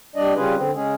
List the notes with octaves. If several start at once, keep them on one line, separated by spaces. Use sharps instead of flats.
G3 D4 D5 D#5
C#3 G3 C#4 F4 G#4 B4
D3 C4
C#3 G#3 C#4 G#4